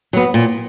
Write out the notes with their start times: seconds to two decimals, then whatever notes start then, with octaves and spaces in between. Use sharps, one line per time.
0.13 F#3 B3
0.34 A#2